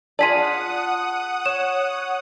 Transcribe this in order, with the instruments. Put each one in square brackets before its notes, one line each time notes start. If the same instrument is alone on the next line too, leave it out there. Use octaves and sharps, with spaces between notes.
[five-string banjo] F4 G#4 D5 [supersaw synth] F#5 D#6 [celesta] A5 B6 D#7
[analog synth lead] C#5 [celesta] E7